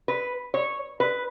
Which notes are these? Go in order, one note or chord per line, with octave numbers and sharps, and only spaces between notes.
B4
C#5
B4